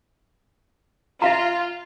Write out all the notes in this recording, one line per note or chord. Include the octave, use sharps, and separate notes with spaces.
F4 E5 F5 A#5